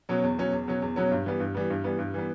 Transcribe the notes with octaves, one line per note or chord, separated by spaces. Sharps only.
B2 F#3 C#4
E2
B2 F#3 C#4
E2
B2 F#3 C#4
E2
B2 F#3 C#4
G2
E3 G3 B3
G2
E3 G3 B3
G2
E3 G3 B3
G2
E3 G3 B3